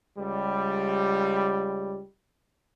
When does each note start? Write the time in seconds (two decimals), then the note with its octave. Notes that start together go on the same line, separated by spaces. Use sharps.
0.17 C#2 G3